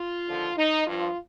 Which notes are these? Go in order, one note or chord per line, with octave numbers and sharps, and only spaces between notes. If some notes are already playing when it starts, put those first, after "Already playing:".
Already playing: F4
D#2 D3 F3
D#4
G2 F3 F4